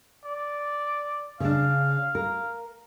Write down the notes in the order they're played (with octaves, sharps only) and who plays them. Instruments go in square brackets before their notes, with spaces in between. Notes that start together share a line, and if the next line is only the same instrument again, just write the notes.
[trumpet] D5
[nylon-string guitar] C#3 D4 [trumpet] F5
[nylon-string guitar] A#4